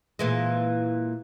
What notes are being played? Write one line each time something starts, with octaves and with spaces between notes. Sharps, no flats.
A#2 E3 G#3